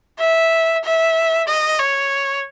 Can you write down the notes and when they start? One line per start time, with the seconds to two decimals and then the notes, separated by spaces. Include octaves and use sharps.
0.19 E5
0.84 E5
1.47 D#5
1.79 C#5